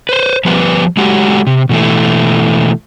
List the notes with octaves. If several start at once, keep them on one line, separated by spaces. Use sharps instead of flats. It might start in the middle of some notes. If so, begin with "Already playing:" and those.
B4 C5
F3 G3 B3 B4
G#3 A3 F#4 G4
C3
B2 E3 A3